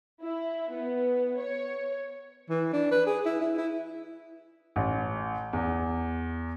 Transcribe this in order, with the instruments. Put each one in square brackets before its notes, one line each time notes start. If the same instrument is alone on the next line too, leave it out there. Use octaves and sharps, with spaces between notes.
[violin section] E4
B3
C#5
[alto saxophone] E3
D4
B4
G#4
E4
E4
E4
[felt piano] A1
E2